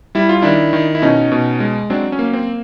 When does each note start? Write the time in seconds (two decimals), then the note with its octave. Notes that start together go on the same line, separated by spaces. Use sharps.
0.15 G3 E4
0.29 F4
0.42 D#3 D4 E4
0.73 D#3
0.95 E4
1.02 B2 C#4 D#4
1.32 B2
1.60 G#3
1.90 F#3 C4 D4
2.12 C#4
2.19 A#3
2.33 C4